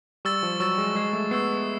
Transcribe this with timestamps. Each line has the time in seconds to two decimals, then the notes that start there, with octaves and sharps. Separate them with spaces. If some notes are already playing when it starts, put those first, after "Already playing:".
0.25 G3 C#6 E6 A6
0.43 F3
0.60 F#3 C#6 E6 A6
0.78 G#3
0.95 G#3 C#6 E6 G#6 C7
1.13 A3
1.31 B3 C#6 E6 G#6 C7